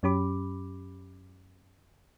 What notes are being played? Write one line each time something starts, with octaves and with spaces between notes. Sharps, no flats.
F#2 F#3 C#4 G4 B5 D6